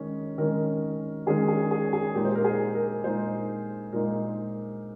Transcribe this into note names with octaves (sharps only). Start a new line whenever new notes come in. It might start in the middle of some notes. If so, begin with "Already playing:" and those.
Already playing: D#3 G#3 C#4
D#3 G#3 C#4 A#4
D#3 G#3 C#4 G#4
G#4
G#4
G#4
A#2 G#3 D#4 G4
C5
A#4
G#4
A#4
A#2 G#3 D#4 C5
A#2 G#3 D#4 A#4